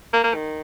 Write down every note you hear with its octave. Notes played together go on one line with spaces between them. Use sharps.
A#3
A#3
D#3